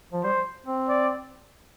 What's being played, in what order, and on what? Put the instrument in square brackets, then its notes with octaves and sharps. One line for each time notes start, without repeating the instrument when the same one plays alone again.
[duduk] F3
[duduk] G3 [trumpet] C5
[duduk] C4
[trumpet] D5